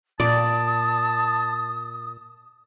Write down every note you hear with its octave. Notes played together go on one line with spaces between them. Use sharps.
A#2 D5 A5 D#6